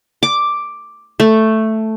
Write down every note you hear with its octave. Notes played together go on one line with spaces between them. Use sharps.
D6
A3